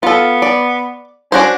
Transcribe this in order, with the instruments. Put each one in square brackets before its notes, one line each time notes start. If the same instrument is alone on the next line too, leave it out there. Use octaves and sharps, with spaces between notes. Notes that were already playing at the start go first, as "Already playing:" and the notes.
[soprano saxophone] B3 [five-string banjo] F4 A4
[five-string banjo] D5
[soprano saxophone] C#4 [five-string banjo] D4 F#4 C5